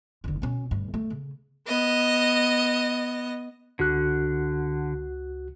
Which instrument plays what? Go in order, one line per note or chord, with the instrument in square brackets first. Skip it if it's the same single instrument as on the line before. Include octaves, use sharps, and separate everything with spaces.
[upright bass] F#1 D3
B2 C#4
D2 G2
A3
C#3
[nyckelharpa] B3 [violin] D#5
[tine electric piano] C#2 F#4 F#6 [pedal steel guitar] D3